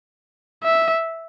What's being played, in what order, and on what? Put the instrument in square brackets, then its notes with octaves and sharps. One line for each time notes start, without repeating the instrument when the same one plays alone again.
[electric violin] E5